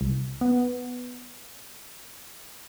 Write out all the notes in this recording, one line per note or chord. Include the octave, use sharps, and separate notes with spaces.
C2
B3